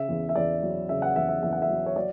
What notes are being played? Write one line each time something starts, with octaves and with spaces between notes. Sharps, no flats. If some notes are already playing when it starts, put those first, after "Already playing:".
Already playing: C#3 E5
E2
E5
E2 D5
F#3
C#3 E5
F#5
E2 E5
E5
E2 E5
F#5
E5
F#3
C#5
F#3 D5